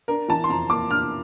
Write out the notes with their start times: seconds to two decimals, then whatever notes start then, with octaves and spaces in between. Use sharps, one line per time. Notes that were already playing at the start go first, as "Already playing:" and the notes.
0.08 D4 A#4
0.28 E3 A5
0.44 C6
0.49 F2 A#5
0.70 A#3 D6
0.90 D4 F6